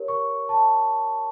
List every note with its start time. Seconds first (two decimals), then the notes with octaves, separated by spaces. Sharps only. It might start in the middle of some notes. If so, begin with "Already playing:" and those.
Already playing: G4 A#4 C#5
0.08 C#6
0.49 A5